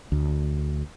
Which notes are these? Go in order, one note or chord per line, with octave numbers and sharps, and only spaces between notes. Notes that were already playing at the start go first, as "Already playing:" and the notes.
D2